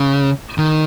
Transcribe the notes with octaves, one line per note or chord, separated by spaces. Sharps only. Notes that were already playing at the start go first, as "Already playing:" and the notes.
Already playing: C#3
D#3